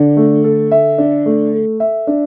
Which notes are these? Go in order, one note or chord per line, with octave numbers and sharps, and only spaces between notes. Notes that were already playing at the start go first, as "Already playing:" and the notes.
Already playing: D3 D4
A3
A4
E5
D4
A3
A4
E5
D4